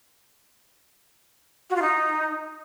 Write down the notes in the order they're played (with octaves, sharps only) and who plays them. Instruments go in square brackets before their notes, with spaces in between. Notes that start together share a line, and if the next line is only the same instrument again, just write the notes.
[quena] F#4
F4
D#4